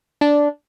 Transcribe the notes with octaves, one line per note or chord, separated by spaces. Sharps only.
D4